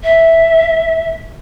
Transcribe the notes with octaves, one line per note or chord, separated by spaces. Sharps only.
E5